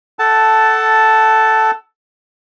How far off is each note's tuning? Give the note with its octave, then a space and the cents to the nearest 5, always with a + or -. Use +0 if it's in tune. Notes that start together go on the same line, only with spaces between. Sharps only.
A4 +0 F#5 +25 A5 +0